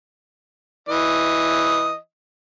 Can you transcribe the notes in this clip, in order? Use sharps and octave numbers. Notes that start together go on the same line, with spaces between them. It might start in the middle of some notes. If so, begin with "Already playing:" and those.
E3 D#5